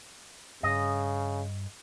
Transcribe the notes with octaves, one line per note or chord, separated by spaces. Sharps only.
G2 C#3 D#5